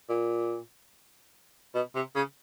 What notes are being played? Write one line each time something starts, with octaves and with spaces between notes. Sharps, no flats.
A#2
B2
C3
C#3